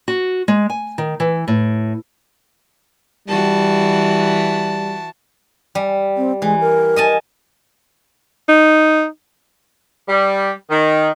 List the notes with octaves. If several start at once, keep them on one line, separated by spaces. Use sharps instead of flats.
F#4
G#3
G#5
D#3
E3
A2
E3 G3 F#4 A5
G3
C4
E3 G#3
A#4
D#5 G#5 A5
D#4
G3
D#3